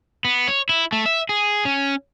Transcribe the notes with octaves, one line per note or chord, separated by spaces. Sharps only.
B3
C#5
E4
A3
E5
G#4
C#4